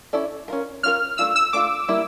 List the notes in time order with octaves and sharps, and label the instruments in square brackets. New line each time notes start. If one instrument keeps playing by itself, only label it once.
[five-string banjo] C#4 E4 A4 D5
C#4 F4 A#4
[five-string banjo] C#4 F4 A#4 [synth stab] F6
[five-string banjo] A3 D4 F4 [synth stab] E6
[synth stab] E6
[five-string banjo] A3 D4 F4 [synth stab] D6
[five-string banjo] G3 A#3 E4